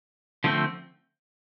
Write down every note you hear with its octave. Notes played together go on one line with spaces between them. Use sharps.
D3 F3 A3 C4